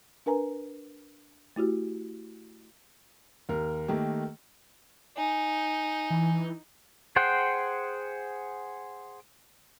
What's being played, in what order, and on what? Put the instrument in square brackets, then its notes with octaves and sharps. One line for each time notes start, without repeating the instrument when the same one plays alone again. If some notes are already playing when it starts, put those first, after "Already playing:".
[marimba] D4 A#4 B4 G#5 A#5
A3 E4 F#4 G4
[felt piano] D#2 A#4
D#3 A3 A#3 G4
[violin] D#4 [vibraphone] G#5
[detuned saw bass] E3
[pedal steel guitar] G#4 C5 F#5 G5